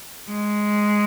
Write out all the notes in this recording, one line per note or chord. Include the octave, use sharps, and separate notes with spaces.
G#3